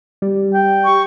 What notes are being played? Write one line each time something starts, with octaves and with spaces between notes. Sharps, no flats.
G3
G5
C#6